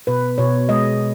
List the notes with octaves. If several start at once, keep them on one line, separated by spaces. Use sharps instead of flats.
B2 B4
B2 C#5
G#3 D#5